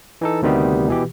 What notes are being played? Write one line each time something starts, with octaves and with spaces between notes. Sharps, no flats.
E3 D#4 A4
D2 C3 D#3 G3 B3
B2 E3 G4